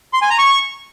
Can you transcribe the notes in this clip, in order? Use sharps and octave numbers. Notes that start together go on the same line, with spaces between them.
C6
G#5
A#5
C#6